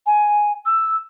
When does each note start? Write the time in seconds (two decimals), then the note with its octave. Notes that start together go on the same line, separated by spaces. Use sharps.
0.06 G#5
0.66 E6